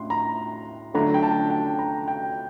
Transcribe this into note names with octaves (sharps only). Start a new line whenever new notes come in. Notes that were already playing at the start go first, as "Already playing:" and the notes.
Already playing: A2 D4 C6
A#5
D3 F#3 A3 D4 A#5
G5
A5
G5
A#5
G5